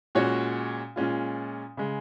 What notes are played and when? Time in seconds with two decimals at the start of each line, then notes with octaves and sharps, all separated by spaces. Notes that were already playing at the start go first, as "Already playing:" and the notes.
0.15 A#2 G#3 C#4 F#4 C#5
0.96 A#2 G#3 C#4 F4
1.77 C#3 G#3